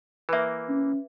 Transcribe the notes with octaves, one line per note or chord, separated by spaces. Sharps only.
E3 A#3 B4 E5
C#4